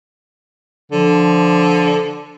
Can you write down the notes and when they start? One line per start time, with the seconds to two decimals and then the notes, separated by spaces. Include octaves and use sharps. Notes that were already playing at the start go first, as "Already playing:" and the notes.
0.92 D3 F3